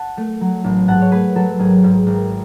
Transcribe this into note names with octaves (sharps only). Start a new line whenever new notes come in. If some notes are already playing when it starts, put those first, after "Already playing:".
Already playing: F#5 A5
A3
F#3
A1
G#2 F#5 A5
C#5
A3 G#4 B4
F#3 A4
G#1 G#4
G#2
G#1